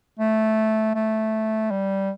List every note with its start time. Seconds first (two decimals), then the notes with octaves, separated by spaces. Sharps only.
0.20 A3
0.95 A3
1.71 G3